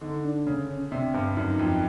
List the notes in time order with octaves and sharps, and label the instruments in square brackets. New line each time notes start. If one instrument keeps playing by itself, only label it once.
[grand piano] D3 [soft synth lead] D#4
[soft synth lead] D4
[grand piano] C#3
[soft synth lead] C#4
[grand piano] C3 [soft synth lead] D4
[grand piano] G2
[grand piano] F#2 [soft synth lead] D#4
[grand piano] F2